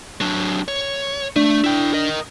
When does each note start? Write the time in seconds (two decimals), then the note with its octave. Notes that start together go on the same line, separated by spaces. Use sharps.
0.21 F#3 D4
0.68 C#5
1.36 A3 D4
1.64 E4 G5
1.93 A#4 D#5